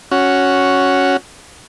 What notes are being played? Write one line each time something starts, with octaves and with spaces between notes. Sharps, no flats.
C#4 F#4